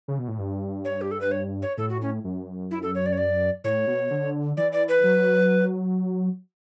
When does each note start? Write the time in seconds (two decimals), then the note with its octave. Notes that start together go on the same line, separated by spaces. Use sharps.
0.08 C#3
0.18 B2
0.28 A2
0.38 G2
0.85 C#5
1.01 G4
1.11 A4
1.21 B4
1.31 C#5
1.62 C#5
1.78 A2 A4
1.89 F#4
2.02 C#4
2.24 F#2
2.71 E4
2.83 A4
2.95 C#5
3.06 D5
3.13 C#5
3.18 D5
3.64 A2 C#5
3.87 B2
4.11 D3
4.57 E3 D5
4.72 D5
4.89 B4
5.03 F#3